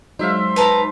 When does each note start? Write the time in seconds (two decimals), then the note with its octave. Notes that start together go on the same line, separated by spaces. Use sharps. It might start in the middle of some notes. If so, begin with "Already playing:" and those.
0.19 F#3 G#3 D#4 C5 E5 F5
0.56 B4 A5 A#5